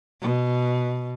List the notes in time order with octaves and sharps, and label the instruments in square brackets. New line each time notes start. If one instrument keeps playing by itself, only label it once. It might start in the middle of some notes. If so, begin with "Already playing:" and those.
[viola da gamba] B2